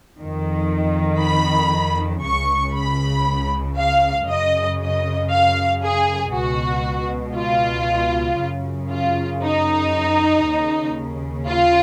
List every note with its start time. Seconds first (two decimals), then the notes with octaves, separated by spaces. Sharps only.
0.19 F2 D#3
1.21 B5
2.24 C#2 C#3 C#6
2.75 B5
3.78 F5
4.29 F#2 C#3 D#5
4.81 D#5
5.32 F5
5.83 G#4
6.34 C#2 B2 F#4
7.37 F4
8.41 F#2 C#3
8.91 F4
9.43 D#4
10.46 D#2 C#3
11.49 F4